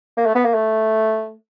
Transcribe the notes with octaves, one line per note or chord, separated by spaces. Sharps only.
A#3
A3
B3
A#3
A3